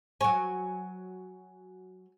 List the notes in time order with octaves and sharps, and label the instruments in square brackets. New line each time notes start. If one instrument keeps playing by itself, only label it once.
[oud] F#3 C#5 [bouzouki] G#5